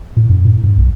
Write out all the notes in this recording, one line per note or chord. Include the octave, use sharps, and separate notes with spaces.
A2
F#2
A2
G2
B1